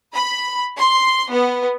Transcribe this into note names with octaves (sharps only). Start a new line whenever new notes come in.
B5
C6
B3